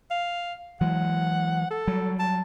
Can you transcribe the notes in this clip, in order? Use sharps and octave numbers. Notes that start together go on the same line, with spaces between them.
F5
E3 F#3 G#3 F#5
A4
F#3 G3
A5